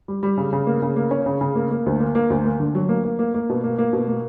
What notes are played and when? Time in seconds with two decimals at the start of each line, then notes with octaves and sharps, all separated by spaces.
0.08 G3
0.23 G3
0.37 C#3
0.53 C#3
0.67 A#3
0.82 C#3
0.96 A#3
1.11 C#4
1.26 C#3
1.41 C#3
1.55 A#3
1.71 A#3
1.86 D2
2.00 A#3
2.15 A#3
2.30 D2
2.45 A#3
2.60 D3
2.75 F#3
2.89 A#3
3.04 A#3
3.19 A#3
3.34 A#3
3.49 B2
3.64 A#3
3.78 A#3
3.93 B2
4.08 A#3